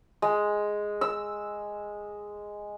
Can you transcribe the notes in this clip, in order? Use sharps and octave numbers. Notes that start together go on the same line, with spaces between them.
G#3
E6